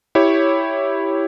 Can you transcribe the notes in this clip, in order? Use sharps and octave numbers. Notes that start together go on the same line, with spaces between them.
E4 G4 C#5